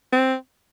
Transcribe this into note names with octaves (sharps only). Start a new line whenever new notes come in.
C4